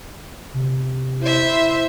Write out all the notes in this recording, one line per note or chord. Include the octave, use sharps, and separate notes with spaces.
C3
E4 C5 E5